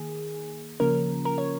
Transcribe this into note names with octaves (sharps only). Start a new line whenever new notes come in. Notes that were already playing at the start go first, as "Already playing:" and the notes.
Already playing: D#3 A#3 G#4
C#3 F3 A#3 C#4 A#4
A#4
C#5